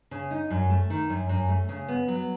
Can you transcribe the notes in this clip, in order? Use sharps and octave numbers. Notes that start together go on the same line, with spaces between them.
C#3
D#4
F#2
A3
D#3
F#2
F#2
A3
C#3
B3
F#3